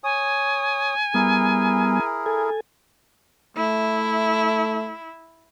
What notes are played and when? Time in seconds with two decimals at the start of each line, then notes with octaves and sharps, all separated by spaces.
0.04 C#5 G#5 D#6
1.14 G3 B3 E4 G#4 A#4
2.26 A4 G#5
3.57 A3 E4